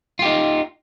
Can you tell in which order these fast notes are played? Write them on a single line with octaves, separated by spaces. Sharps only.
F4 G4 D#4